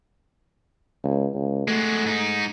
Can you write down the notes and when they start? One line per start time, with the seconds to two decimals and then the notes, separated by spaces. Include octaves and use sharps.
1.04 C#2
1.34 C#2
1.68 G#3 A3 F#4
2.06 G#2 D#4